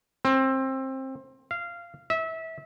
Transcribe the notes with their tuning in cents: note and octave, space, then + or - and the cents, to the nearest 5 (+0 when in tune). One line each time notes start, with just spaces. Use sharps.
C4 +20
F5 -15
E5 -25